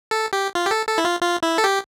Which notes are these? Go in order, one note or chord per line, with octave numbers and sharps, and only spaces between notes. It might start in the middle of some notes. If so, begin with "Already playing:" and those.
A4
G4
F4
G4
A4
A4
E4
F4
F4
E4
A4
G4